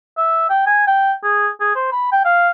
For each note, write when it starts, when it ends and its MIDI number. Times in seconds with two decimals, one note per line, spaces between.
0.17 0.49 76
0.49 0.62 79
0.66 0.83 80
0.87 1.13 79
1.23 1.48 68
1.60 1.75 68
1.75 1.88 72
1.92 2.08 83
2.12 2.22 79
2.25 2.49 77